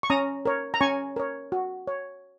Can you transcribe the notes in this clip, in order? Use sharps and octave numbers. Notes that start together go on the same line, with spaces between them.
C#6
C#4 A#5 D#6
A#4 C#5
A#5
C#4 G#5 C#6
A#4 C#5
F#4
C#5